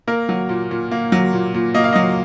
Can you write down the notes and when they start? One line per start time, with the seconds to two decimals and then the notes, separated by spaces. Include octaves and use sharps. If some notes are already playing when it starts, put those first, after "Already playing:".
0.07 A#3 A#4
0.29 F#3
0.49 A#2
0.71 A#2
0.91 A#3
1.12 F#3
1.33 A#2
1.54 A#2
1.74 A#3 D#5
1.84 F5
1.93 F#3 D#5